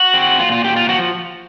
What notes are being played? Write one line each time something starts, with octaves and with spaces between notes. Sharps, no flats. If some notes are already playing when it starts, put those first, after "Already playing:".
Already playing: F#4
C4
A#2 F4
F4
A#2 G4
F4
F3 F#4